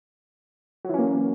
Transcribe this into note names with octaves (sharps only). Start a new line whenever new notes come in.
E3 F#3 A#3 C#4